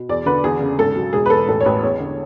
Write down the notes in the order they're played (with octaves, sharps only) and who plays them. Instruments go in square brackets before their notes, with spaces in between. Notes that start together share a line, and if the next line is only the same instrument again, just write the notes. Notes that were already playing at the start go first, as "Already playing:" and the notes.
Already playing: [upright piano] B2
E2 D5
D3 B4
E2 G#4
C#3
G#1 A4
F#3
E1 G#4
B4
E2 A4
A1 A4
C#5
A1 B4
E2 C#5
D3